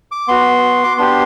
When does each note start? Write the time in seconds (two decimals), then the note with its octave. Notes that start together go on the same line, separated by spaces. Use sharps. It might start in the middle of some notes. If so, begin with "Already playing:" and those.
0.12 D6
0.28 B3 F#4 C6
0.84 D6
0.97 B3 D4 G4 C6